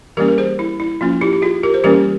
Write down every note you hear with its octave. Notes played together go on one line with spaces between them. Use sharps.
E3 G3 A#3 C#4 G4 A#4
A#4
G#4 C5
E4
E4
F3 A#3 C#4 F4
E4 G4
G4
F4 G#4
G4 A#4
C5
E3 G3 A#3 C#4 G4 A#4